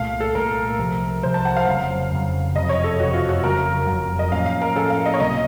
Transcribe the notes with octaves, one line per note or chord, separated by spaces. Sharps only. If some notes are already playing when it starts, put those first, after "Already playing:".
Already playing: C2 A#2 A3 F5
A4
C2 A#2 A3 A#4
C2 C3 F3
C2 C3 F3 C5
A5
F#5
F5
F1 F2 C#3 F#3
F1 F2 C#3 F#3
F#1 F2 C3 D#5
C#5
A4
F#1 F2 C3 F#4
F4
F#4
F1 F2 C#3 F#3 A#4
F1 F2 C#3 F#3
D#5
A2 F3 A#3 C#4 F5
F5
A#4
A2 F3 A#3 C#4 A4
F5
D#5
C#5
C#2 C3 F#3 A#3 D#5